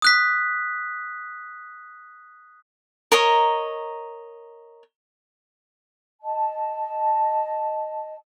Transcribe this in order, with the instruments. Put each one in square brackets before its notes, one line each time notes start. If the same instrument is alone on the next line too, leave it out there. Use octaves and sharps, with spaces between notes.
[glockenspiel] D#6 F#6 B6
[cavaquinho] A#4 C#5 D#5 A#5
[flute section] D#5 A5